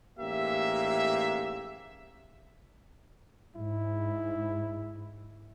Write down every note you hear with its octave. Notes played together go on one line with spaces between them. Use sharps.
A1 G#2 A#3 G4 E5
G#2 E4